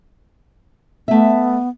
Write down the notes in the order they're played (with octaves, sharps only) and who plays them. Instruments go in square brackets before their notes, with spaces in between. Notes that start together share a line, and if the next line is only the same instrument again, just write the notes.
[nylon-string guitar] A3 E5 [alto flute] B3